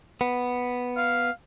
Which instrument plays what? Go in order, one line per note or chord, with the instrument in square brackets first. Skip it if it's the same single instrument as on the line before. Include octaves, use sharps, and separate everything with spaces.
[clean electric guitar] B3
[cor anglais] F5